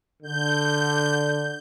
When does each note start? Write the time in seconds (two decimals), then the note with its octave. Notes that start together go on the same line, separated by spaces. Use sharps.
0.23 D3 G6